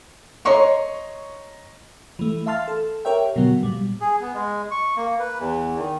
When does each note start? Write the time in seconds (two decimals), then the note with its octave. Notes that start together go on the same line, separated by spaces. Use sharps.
0.45 C#5 D#5 A#5 C6 C#6
2.19 E3 A3
2.46 E5 F5 A5 C6 F6 A6
2.68 A4
3.05 G4 A#4 C#5 E5 G5
3.36 B2 D3 F#3 B3
3.63 A#2 G3
4.01 G#4
4.21 B3
4.34 G#3
4.71 C#6
4.96 A#3
5.19 B4
5.39 E2
5.77 D#3